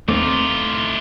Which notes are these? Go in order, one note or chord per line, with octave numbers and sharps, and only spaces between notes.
D#2 E3 A3 C4 D#4 F4 D6